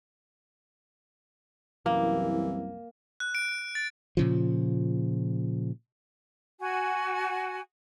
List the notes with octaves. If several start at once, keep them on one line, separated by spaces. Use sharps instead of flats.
C2 F#2 E3 A#3
F#6
D7
A6
A#2 C#3 F3
F#4 G#5